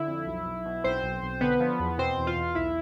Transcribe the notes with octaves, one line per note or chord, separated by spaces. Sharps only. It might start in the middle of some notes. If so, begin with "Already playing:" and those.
Already playing: D3 E4 E5
F2
B1
B1
B2
B1 C4 C5
B1
B1
D3 B3 B4
F3
E2
B2 C4 C5
E2
F4 F5
E2
B1 E4 E5